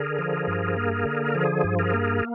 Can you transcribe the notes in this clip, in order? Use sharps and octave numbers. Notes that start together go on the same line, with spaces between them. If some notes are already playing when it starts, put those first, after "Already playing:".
Already playing: D3 G#4 A#4
F3
G2
A#3
D3
F3 G#4
G2
G#4 A#4
A#3